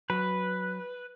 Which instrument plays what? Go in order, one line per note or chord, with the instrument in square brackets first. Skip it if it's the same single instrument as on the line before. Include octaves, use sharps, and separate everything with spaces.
[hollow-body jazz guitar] F#3 [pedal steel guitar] B4